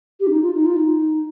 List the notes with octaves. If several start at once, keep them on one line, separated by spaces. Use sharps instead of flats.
G4
D4
D#4
F4
D#4
F4
D#4